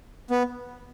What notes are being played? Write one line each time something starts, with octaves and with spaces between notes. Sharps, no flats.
B3